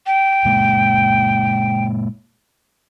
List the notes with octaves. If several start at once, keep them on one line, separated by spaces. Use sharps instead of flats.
G5
A#2 G#3 A#3